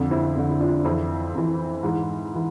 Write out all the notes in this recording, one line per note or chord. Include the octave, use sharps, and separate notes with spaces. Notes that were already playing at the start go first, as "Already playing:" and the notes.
Already playing: F2 D3
C4 E4
F2 D3
E4
D4 F4
F2 E3 C4 E4
F2 E3
G#2 E3
E3